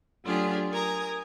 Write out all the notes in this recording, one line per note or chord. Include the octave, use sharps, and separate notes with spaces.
F#3 A3 D4 F4 G4 G#4
A#4 G#5 A#5 D#6